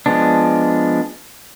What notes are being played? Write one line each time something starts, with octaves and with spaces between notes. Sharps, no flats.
F3 G#3 B3 D4